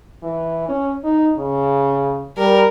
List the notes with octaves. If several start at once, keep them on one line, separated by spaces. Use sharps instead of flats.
E3
C#4
D#4
C#3
G3 A#4